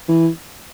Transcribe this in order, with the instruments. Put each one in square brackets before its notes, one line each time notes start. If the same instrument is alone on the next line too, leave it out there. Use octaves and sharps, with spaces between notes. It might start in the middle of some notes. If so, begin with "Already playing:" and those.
[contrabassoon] E3